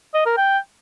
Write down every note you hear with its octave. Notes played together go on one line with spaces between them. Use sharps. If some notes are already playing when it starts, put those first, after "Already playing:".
D#5
A#4
G5